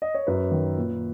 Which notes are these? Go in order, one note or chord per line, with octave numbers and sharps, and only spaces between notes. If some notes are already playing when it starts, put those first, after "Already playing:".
D#5
C#5
F#2 B4
D#3
A#2